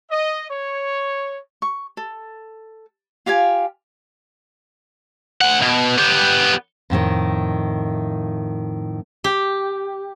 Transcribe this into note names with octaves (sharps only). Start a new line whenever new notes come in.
D#5
C#5
C#6
A4
F4 G4 F5 G#5
D2 F#5
B2
B3 G4
F2 A2 D3 D#3
G4